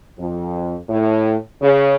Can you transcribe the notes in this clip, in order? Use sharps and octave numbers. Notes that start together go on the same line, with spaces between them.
F2
A2
C#3